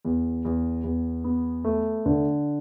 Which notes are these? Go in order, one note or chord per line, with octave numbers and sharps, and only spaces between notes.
E2
E2
E2
B3
A3
D3